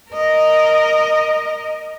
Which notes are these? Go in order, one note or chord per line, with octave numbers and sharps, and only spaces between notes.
A#4 D#5